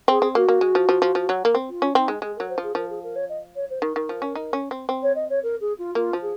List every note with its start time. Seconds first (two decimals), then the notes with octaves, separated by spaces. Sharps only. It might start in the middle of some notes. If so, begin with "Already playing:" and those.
0.08 C4 G#4
0.22 C4
0.35 A#3 F#4
0.48 A#3
0.61 G#3
0.75 F3
0.89 F3
1.02 F3
1.15 F3
1.29 F#3
1.45 A#3
1.55 C4
1.69 F4
1.82 C#4
1.95 C4 D#4
2.08 G#3
2.22 G#3 G#4
2.36 F#3 A#4
2.49 C5
2.58 F3 G#4
2.75 F3 A#4
2.89 G#4
3.03 A#4
3.15 C#5
3.28 D#5
3.55 C#5
3.69 C5
3.82 D#3 A#4
3.96 D#3
4.09 F3
4.22 C#4
4.35 D#4
4.53 C#4
4.71 C4
4.89 C4
5.02 C#5
5.15 D#5
5.29 C#5
5.42 A#4
5.60 G#4
5.78 F4
5.95 A#3 F4
6.13 F3
6.22 G#4